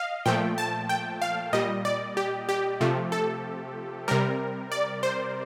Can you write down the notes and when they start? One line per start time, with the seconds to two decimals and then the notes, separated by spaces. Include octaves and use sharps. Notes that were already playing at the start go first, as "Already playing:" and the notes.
Already playing: D#5 F5
0.26 A#2 F3 A3 G5
0.58 A5
0.89 G5
1.22 F5
1.53 A#2 G3 D#5
1.85 D5
2.17 G4
2.49 G4
2.81 C3 F3 A3
3.12 A4
4.08 C3 G3 A#4
4.72 D5
5.03 C5